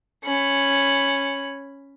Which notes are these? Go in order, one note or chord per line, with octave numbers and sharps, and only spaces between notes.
C#4 B5